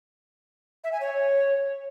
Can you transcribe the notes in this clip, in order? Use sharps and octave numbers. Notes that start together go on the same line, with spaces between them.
E5
G#5
C#5